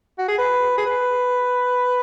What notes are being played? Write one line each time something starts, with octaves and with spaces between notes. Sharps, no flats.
F#4
G#4
B4
G#4
B4